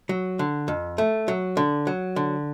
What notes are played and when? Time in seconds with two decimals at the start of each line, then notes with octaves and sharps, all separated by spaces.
0.09 F#3
0.39 D3
0.68 F2
0.98 A3
1.28 F#3
1.57 D3
1.87 F#3
2.16 D3